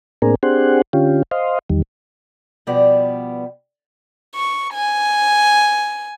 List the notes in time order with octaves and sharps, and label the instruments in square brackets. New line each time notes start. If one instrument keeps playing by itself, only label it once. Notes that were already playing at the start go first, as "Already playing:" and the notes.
[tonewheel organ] A2 A#3 C4 D4 G#4 A#4
C4 D4 G4 G#4 C5 F#5
D3 C#4 F4 G4
C5 D#5 F5
E2 D#3 G3
[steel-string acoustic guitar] B2 F3 G3 B3 D5
[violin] C#6
G#5